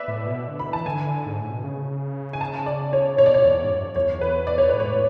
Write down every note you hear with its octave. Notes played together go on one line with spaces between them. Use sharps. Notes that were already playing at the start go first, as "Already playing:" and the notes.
Already playing: B4 D5 E5
A2
B2
D3
B5
E3
A5
D3 G#5
G#2
A2
B2
C#3
G#5
A5
D5
C#5
B2 C#5
D5
C#5
E2
G#2
F#2
E2 C#5
B4
D5
C#5
A2 B4
G#2 C#5
A2